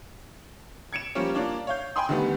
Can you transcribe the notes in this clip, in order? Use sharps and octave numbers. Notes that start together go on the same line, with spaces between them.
G#6 C#7 D7 E7
F3 G3 A#3 C#4 C#5
A#3 D4 F4 C#5
C#5 F5 G6
G5 G#5 B5 C6 D#6
D3 D#3 G3 A3 B3